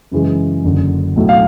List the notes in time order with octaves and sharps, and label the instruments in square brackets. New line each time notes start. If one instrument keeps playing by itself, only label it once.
[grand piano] F#2 C#3 E3 G#3
F#1 F#2 D3
B1 A2 F#3 A3
F5